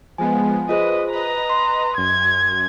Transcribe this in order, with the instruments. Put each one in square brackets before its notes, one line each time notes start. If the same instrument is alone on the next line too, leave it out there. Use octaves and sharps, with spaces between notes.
[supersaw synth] F3 G#3 B3 [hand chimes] G#5
[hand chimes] F4 G#4 C5 [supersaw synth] B4 [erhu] D#5
[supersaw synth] B4 D#5 [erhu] A#5
[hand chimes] C6
[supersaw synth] F#2 [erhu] G#6